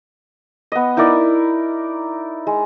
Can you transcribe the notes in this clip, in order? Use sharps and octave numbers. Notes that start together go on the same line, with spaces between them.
B3 D#5
D#4 E4 A#4 D5
G#3